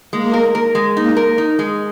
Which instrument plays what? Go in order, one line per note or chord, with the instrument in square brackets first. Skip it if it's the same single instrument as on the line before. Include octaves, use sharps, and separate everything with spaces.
[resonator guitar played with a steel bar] G#3 [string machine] A#3
[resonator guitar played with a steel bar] A#4
A#4
G#3
[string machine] A#3 [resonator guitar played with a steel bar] D#4
[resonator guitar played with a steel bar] A#4
D#4
G#3